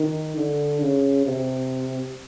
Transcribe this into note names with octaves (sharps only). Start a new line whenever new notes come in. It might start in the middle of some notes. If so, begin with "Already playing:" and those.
Already playing: D#3
D3
C#3
C3